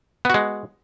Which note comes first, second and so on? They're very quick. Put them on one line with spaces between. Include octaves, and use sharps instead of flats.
B3 F#4 G#3